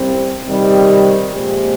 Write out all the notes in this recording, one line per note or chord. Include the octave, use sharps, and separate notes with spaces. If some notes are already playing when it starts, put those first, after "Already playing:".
Already playing: C2 C3 G3 C4
C3 D#3 G3
A#2 F3 G#3 C4 G4